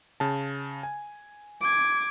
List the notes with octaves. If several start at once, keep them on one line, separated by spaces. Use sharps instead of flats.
C#3 A5
G#5
D6 G#6